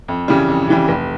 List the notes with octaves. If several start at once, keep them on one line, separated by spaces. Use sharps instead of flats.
F2
C#3 E3 G3
F2
C#3 E3 G3
F1